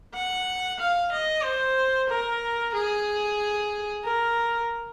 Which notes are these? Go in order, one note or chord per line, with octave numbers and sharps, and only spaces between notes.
F#5
F5
D#5
C5
A#4
G#4
A#4